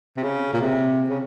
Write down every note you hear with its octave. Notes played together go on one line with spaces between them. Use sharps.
C3
C#3
A#2
C3
C#3